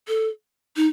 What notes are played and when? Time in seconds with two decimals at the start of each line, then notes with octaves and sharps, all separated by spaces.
0.08 A4
0.76 D#4